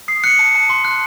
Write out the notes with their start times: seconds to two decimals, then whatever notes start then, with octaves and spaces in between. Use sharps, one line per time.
0.08 D#6 C7
0.24 F#6 C#7
0.39 A5
0.55 A5
0.69 C6
0.85 F#6